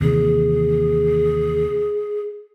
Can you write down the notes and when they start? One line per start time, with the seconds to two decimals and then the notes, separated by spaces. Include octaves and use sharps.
0.01 D#2 C3 E3 G#4